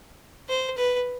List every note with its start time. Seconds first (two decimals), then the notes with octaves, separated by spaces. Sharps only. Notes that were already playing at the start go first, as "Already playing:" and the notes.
0.49 C5
0.77 B4